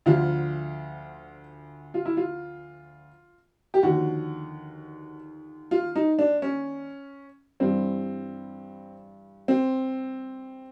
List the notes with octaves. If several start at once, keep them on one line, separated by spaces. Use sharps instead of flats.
D2 D3 F3 F4
F4
E4
F4
G4
D#2 D3 F3 F#4
F4
D#4
D4
C#4
G2 E3 G3 C4
C4